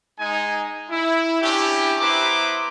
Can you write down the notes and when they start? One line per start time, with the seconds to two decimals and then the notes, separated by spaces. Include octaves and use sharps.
0.19 G#3 D#4 G#5
0.90 E4
1.42 C#4 D4 E4 G4
2.01 B3 E4 B4 C5 A#5 D6